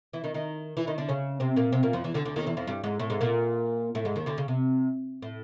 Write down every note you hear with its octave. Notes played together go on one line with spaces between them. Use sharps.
E3 E4
D#3 D#4
D#3 D#4
E3 E4
D#3 D#4
D3 D4
C#3 C#4
C3 C4
A#2 A#3
C3 C4
A#2 A#3
F2 F3
E2 E3
D2 D3
D2 D3
D#2 D#3
E2 E3
F2 F3
G2 G3
G#2 G#3
A2 A3
G#2 G#3
A#2 A#3
A2 A3
G#2 G#3
D#2 D#3
D2 D3
C#3
C3
A2